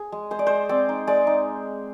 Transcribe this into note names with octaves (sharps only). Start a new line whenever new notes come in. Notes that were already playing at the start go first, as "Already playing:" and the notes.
Already playing: G#4
G#3
G#3 C5
D5
G#3 C5
C4 D5
D#4
G#3 D5
D#4